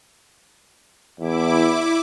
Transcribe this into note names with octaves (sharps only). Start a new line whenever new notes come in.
E2 E4 D6